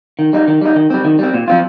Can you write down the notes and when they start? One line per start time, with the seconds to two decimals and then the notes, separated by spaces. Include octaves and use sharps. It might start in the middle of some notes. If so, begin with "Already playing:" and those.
0.19 D#3
0.33 G3 D#4
0.48 D#3
0.61 G3 D#4
0.76 D#3
0.90 G3 C4
1.05 D#3
1.19 G3 C4
1.34 A#2
1.48 F3 C4 F4